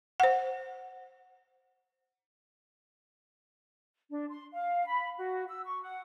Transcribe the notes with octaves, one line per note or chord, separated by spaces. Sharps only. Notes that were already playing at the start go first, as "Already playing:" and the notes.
C5 F#5
D4
C6
F5
B5
F#4
E6
C#6
F#5